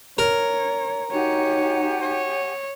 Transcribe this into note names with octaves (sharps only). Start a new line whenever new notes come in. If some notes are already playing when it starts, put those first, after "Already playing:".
A#4 C#5
D#4 F#4 G4 C#5 F#5 G#5
C#5